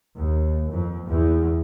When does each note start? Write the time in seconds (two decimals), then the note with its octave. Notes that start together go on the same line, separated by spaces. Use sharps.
0.17 D#2
0.71 F2
1.08 E2